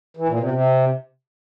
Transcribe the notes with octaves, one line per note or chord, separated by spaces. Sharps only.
E3
A#2
C3
C3